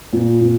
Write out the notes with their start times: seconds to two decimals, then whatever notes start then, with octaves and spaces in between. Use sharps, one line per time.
0.13 A#2
0.41 A#2